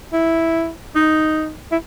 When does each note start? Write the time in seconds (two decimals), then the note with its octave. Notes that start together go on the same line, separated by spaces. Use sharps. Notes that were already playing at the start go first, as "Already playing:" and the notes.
0.13 E4
0.95 D#4
1.72 E4